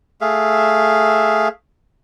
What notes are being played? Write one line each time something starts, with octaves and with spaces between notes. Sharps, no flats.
A3 G#4 E5 F5